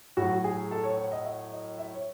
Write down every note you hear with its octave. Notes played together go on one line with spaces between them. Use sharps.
A2 F#4
F#3
G#4
A4
C#5
C#5
D#5
E5
D#5
E5
C#5